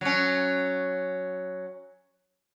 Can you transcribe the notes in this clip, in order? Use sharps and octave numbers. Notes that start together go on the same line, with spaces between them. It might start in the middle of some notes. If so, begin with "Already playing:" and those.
F#3 C#4